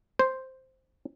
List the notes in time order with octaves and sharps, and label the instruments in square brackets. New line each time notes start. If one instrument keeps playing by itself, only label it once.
[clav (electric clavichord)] C5